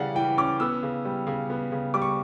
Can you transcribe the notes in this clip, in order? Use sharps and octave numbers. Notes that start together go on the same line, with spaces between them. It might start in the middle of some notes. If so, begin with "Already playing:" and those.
Already playing: C#3 E3 G3 C#4 D5 F#5
E3 G5
C#4 D6
B3 E6
C#3
G3
C#3
B3
C#3
G3 D6
C#6